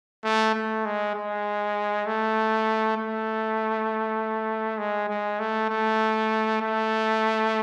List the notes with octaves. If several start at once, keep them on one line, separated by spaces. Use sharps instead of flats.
A3
A3
G#3
G#3
A3
A3
G#3
G#3
A3
A3
A3